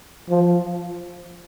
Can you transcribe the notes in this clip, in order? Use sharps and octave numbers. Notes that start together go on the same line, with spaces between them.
F3